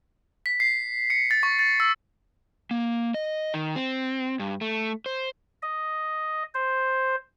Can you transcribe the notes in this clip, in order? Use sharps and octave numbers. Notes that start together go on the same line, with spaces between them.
B6
C7
C#7
A6
C#6
A6
E6
A#3
D#5
D#3
C4
G2
A3
C5
D#5
C5